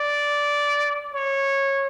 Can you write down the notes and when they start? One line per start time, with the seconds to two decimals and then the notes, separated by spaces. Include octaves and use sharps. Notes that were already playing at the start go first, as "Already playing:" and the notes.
Already playing: D5
1.13 C#5